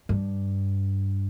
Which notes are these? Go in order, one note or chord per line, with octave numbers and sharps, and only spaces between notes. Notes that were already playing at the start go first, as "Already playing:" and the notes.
G2